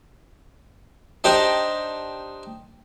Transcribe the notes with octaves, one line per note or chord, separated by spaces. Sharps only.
D4 D#4 G4 C5 G5 A#5